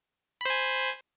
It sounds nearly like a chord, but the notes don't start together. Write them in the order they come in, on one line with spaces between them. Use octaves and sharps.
B5 C5 G#5